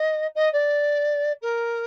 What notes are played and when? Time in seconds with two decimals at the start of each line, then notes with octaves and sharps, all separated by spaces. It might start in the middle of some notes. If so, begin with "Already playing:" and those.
Already playing: D#5
0.35 D#5
0.52 D5
1.41 A#4